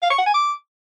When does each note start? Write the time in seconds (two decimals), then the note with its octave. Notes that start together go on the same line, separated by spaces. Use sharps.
0.02 F5
0.10 C#6
0.18 F#5
0.26 G#5
0.34 D6